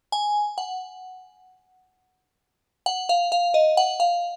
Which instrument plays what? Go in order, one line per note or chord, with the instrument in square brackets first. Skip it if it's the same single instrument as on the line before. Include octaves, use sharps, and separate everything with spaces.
[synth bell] G#5
F#5
F#5
F5
F5
D#5
F#5
F5